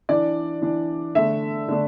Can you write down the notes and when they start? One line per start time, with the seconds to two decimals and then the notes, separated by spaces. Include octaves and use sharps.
0.09 E3 D4 D5
0.62 E3 D4
1.15 D3 A3 D4 E5
1.68 D3 A3 D4